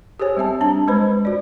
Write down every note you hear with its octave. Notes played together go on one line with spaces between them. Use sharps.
G4 G#4 C5 C#5 G#5
G3 C4 E5 A5
D4 A5
G#3 B4 C5 B5
F#4 D5